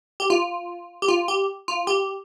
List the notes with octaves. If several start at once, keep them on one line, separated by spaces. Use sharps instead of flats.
G4
F4
G4
F4
G4
F4
G4